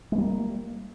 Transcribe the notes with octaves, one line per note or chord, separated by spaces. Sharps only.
G3 G#3 A#3 B3